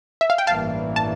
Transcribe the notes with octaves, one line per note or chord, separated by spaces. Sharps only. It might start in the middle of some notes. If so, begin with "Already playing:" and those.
E5
F5
G5
A1 G2 E3 A#3 F5 A5
A5